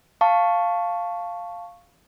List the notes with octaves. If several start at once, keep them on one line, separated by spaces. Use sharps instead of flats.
F5 A5 C#6